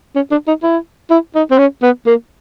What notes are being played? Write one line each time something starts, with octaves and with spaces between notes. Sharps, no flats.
C#4
D4
D#4
E4
E4
D#4
C4
C#4
B3
A#3